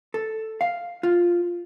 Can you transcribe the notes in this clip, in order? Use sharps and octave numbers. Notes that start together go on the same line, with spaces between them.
A4
F5
F4